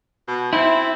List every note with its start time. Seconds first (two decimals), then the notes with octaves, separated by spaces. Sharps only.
0.28 B2
0.53 C4 E4